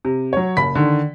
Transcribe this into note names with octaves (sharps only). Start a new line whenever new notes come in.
C3
F#3 C#5
F#1 B5 B6
D3 D#3